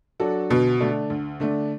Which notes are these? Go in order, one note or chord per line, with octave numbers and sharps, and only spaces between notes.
F#3 D4 F#4 A4
D2 B2
D3 A3 D4
D2
D3 A3 D4